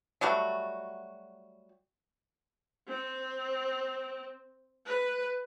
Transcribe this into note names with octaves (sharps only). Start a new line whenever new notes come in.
F#3 G3 A3 F#4
C4
B4